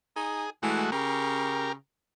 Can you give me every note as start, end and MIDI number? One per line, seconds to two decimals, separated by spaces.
0.16 0.46 63
0.16 0.50 68
0.63 0.86 52
0.63 0.91 56
0.63 0.91 57
0.63 0.91 66
0.92 1.74 49
0.92 1.72 67
0.92 1.72 70